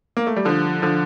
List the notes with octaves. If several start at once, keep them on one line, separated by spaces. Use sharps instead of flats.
A#3
A3
G3
D3 F3
D3 F3